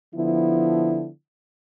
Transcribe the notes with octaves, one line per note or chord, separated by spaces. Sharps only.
D3 F3 B3 E4